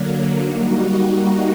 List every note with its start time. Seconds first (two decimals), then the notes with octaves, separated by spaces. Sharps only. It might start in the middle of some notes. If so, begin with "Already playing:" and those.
Already playing: D3 F#3 A#3
0.42 G3 A#3 D#4 F#4